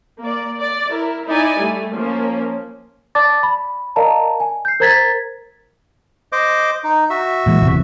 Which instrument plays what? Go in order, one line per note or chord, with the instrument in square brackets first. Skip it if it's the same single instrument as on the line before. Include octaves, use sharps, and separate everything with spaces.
[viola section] A#3 D5
D5
E4 A#4
D#4 E4 D5 G#5
G3 A3
F3 A#3 C#4
[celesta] D5 A5 D6 A6
B5
A#4 D5 D#5 F5 A5 A#5
G#5
G6 C7
A#4 C5 A#5 G#6 A6 B6
[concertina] C5 D#5 D6
D#4
F#4 E5
[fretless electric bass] A#2 E3 G#3
F#1 E2 C3